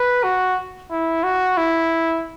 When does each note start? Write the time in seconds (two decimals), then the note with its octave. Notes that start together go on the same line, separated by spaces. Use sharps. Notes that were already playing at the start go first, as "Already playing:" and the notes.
Already playing: B4
0.23 F#4
0.91 E4
1.24 F#4
1.57 E4